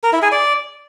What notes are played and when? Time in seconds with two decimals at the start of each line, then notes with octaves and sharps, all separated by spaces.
0.03 A#4
0.13 E4
0.22 G#4
0.32 D5